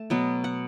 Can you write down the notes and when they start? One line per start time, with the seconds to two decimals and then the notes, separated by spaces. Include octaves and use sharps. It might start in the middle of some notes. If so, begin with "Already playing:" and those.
Already playing: A3 A5
0.10 B2 F#3 B3
0.44 F#5